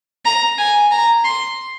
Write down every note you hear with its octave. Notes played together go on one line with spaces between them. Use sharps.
A#5
G#5
A#5
C6